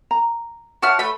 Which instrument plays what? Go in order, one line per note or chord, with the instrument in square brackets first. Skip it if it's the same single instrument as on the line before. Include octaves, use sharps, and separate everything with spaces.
[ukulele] A#5
[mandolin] F#4 A5 F6 [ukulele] B4 C#5 E5
[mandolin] A3 B5